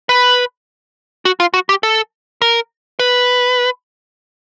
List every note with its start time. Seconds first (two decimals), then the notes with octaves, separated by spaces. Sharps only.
0.09 B4
1.25 F#4
1.40 F4
1.54 F#4
1.69 G4
1.83 A4
2.42 A#4
2.99 B4